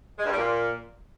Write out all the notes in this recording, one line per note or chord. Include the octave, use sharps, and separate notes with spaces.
G#3
G2
G3
A#2